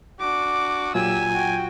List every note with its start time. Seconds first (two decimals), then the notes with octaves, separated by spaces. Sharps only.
0.20 D4 F#4 D6
0.95 A#2 F#3 F4 G4 G#5 E6
1.33 F#4 G5